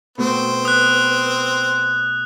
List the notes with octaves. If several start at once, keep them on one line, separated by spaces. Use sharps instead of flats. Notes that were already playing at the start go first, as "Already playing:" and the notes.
B2 A3 C4 B4
D#6 F#6